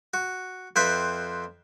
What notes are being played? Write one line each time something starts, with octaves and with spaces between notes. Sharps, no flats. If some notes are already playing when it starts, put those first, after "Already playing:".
F#4
F2 C4 B4 E5